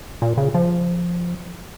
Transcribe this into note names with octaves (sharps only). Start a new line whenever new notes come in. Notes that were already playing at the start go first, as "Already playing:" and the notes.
A#2
C#3
F3